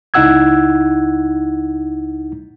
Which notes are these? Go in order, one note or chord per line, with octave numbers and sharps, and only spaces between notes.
C#2 D#4 E4 F#5 E6 G#6